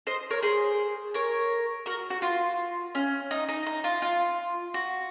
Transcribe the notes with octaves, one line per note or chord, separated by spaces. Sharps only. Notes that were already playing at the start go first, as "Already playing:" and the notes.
C5 D#5
A#4 C#5
G#4 C5
A#4 C#5
F#4 A#4
F#4
F4
C#4
D#4
D#4
D#4
F4
F4
F#4